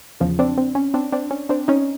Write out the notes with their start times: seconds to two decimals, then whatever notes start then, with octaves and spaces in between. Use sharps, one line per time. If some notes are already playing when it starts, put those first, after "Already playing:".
0.20 E2 C#3 F3
0.39 C4 D4
0.58 C4
0.75 C#4
0.94 C4 D4
1.12 C4 D4
1.31 C#4
1.49 C4 D4
1.68 C#4 D#4